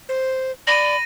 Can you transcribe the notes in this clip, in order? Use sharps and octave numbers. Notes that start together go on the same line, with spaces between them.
C5
D5 B5 A#6 D#7